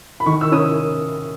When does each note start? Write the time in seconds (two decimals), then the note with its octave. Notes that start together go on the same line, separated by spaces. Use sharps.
0.20 B5
0.26 D#3 C#6
0.41 E6
0.52 C#4 D#6